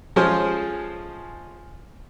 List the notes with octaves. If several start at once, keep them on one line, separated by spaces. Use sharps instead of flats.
F3 G#3 C#4 F4 G#4 C5